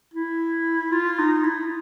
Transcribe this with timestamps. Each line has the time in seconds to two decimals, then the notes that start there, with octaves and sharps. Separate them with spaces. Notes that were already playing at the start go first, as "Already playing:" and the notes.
0.14 E4
0.92 F4
1.19 D#4
1.44 E4